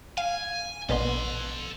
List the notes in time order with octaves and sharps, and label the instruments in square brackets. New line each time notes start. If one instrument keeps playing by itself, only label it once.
[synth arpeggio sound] F5 [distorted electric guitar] G#5
[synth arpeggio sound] A#1 B2 B3 [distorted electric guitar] A4 C6